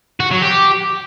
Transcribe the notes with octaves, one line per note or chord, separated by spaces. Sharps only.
F#4
F#3
G4